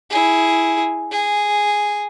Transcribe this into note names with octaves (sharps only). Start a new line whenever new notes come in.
E4 G#4
G#4